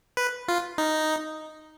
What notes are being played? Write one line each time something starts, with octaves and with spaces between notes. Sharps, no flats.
B4
F4
D#4